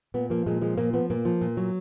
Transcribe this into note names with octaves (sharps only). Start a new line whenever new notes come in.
A#2 B3
F3 A#3
A#2 G#3
F3 G#3
A#2 A#3
F3 B3
A#2 A#3
F3
A#2
F#3